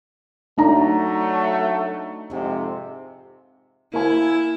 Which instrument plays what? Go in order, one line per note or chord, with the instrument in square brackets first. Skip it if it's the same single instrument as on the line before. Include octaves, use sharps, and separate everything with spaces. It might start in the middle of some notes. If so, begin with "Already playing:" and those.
[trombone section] F#3 A3 [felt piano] D4 D#4 A#5
[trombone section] F2 G#2 C3
[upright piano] A#3 G#5 [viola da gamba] E4